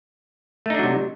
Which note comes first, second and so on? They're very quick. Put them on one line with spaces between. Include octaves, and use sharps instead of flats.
A3 D#4 D4 F#3 C3